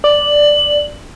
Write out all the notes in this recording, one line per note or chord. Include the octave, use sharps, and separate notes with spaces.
D5 F#7